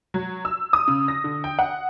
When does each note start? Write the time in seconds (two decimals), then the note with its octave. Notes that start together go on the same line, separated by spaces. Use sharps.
0.14 F#3
0.45 E6
0.73 D#6
0.88 C#3
1.08 A#6
1.24 D3
1.44 G5
1.59 F#5